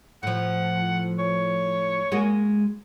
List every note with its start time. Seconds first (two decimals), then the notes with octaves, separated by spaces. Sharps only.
0.23 A2 F3 F#5
1.19 C#5
2.12 G#3 A#3 F#4